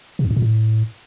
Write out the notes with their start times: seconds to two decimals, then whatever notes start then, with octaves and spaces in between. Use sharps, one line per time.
0.19 C3
0.25 F2
0.31 G2
0.36 A#2
0.42 A2